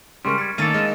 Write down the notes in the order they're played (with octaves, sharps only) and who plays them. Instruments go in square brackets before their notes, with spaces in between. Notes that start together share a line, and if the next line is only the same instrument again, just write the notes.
[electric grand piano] C#3 G#3 A#4 [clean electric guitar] G3 [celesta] C6 C#6 F6
[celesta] G#6 C#7 [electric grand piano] A6
[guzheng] D#3 A#3 [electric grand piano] A3 A6 [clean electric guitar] C#4 A4
[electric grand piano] G#3 D#5 [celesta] F6 E7